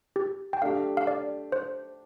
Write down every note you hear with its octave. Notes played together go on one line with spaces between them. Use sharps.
G4
G5
A3 D4 G4 F5
F5
D5
C5